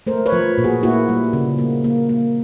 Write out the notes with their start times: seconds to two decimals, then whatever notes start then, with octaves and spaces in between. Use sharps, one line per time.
0.07 A3 A#4 C5
0.26 B4 C#5
0.32 F3
0.58 A#2
0.64 F#4 G#4
0.83 A#3 E4 F#4
1.09 G3
1.33 C#3
1.59 A#3
1.84 A#3
2.09 A#3